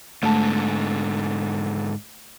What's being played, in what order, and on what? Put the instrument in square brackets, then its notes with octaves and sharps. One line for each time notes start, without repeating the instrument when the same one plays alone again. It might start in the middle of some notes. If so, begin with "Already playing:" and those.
[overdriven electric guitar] G#2 D3 [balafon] A3 A5